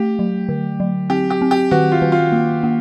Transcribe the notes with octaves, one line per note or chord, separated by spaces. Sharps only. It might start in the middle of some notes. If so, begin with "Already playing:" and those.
Already playing: A3 G4
F#3
D3
F#3
C4 G4
G4
C4
G4
D#3 F#4
F4
D#3
F4
A#3
A#3